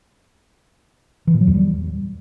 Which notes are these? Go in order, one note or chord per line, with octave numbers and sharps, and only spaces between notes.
E3
A#2
F#3
E2
G3